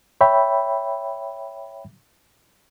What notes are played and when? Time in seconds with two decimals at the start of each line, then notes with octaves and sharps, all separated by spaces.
0.21 C#5 E5 G5 B5